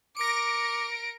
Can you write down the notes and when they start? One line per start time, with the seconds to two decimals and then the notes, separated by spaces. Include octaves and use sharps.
0.17 A#4 D6 A#6 C#7 D7